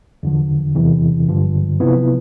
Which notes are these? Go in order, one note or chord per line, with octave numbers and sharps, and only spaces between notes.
E2 D3 F3
E2 C3 E3
G2 D3 F3
C3 F3 B3 E4